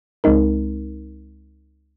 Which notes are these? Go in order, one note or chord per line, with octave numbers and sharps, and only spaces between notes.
C#2 G#3 C4 D#4 A#4